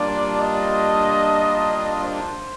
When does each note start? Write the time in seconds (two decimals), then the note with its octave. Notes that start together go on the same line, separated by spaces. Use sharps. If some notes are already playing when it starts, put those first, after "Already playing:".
Already playing: G3 A#3 D4 F4 D5
0.41 D#5
2.04 C5